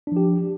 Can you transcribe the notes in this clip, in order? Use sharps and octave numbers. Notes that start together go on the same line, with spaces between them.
F3 D4 G4